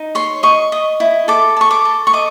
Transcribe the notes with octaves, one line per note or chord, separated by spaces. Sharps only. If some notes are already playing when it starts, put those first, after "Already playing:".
Already playing: D#4
C#5 C6
D#5 C#6
D#5
E4
A4 D6
A4 C#6
D6
A4
C#6
D#5 D6